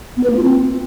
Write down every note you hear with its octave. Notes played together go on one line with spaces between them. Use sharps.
B3
B4
A#3
F4
C4